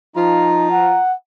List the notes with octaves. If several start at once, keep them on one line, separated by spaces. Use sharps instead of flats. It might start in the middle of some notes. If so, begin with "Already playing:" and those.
F3 D#4 F4 A#5
F#5